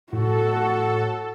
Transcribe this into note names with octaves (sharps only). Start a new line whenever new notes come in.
A2 F#4 A4